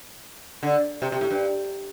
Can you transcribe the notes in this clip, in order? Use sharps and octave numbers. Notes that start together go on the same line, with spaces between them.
D3
C3
C3
A2
G2